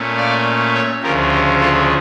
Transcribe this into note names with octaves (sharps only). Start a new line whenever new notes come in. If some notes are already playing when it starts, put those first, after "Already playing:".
Already playing: A#2 A3 C#4
D5 F5
C#5 E5
D2 C#3 F3 G4 A#4
G4
F4 A4